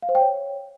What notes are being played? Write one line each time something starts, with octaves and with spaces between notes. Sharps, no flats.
F5
C5
G5
C#5